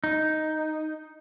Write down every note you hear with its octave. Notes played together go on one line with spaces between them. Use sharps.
D#4